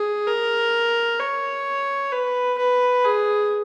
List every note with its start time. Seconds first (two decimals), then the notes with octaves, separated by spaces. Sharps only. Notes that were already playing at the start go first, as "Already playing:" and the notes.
Already playing: G#4
0.27 A#4
1.20 C#5
2.12 B4
2.58 B4
3.05 G#4